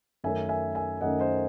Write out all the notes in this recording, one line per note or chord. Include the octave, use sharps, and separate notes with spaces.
F#2 D#3 A3 C#4 E5 G#5
E5 G#5
E5 G#5
F#2 D#3 A3 C#4 D#5 F#5
C5 D#5